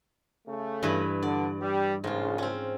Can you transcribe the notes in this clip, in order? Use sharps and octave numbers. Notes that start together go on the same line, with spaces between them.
C#3 A3
G2 E3 B4
D3 D5
G3
A#1 G#2 C#3 F4
C4 C#4